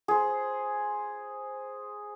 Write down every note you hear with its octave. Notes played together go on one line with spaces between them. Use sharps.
G#4 C5